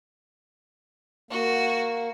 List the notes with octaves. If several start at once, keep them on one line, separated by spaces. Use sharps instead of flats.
A#3 F#4